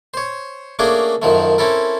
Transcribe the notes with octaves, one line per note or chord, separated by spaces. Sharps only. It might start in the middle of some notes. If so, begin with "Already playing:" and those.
C5 C#5
A3 A#3 C#4 D4 G#4 A#4
F#2 D#3 F3 A3
C4 C#4 E4 A4 A#4